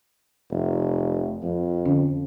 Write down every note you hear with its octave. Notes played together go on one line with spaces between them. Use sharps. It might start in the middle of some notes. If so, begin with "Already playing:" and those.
F1
F2
D3 C#4